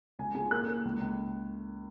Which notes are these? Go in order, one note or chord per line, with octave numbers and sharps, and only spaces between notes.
C#2 G#5
C#3 G#5
A#3 F#6
A#3
C#2
C#2